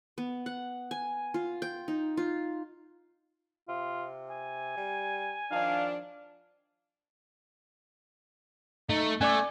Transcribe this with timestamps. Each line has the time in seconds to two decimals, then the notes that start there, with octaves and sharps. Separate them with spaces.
0.18 B3
0.46 F#5
0.91 G#5
1.34 F4
1.62 G5
1.88 D#4
2.17 F4
3.68 C3 F4
4.30 G#5
4.77 G3
5.51 D#3 F3 D4 F5
8.89 A3 D#4
9.21 A3 C#4 D5 G#5 D6